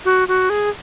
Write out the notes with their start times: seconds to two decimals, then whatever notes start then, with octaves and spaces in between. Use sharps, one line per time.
0.05 F#4
0.28 F#4
0.50 G#4